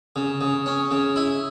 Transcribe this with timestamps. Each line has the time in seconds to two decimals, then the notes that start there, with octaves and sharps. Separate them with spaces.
0.16 C#3
0.41 C#3
0.66 C#4
0.91 C#3
1.16 E4